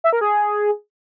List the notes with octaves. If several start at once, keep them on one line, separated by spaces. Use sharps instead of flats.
E5
A#4
G#4